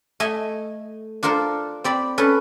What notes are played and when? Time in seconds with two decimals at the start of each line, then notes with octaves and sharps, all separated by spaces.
0.20 A3 D#5 E5 G#5
1.23 D4 F4 A4 A#4 C5
1.84 C4 D5 B5
2.18 C#4 A4 B4